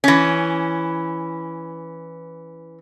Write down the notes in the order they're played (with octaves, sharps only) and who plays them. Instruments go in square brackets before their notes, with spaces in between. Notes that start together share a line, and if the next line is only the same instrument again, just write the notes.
[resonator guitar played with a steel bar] E3 C#4